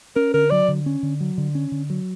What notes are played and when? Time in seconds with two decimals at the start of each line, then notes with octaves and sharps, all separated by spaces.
0.16 C#4 A#4
0.34 D3 A#4
0.50 F#3 D5
0.68 D3
0.86 C#4
1.03 D3
1.20 F#3
1.38 D3
1.55 C#4
1.72 D3
1.90 F#3